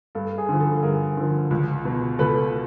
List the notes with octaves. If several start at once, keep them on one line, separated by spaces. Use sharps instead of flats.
G2 A4
G#4
D3 F3
A4
G2 G#4 A#4
D3 F3
C#2
B2
C#2 A4 B4